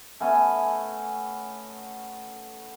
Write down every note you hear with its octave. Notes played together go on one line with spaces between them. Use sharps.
A3 B3 C#4 G#5